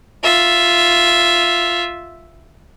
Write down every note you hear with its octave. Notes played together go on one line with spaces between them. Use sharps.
F4 E5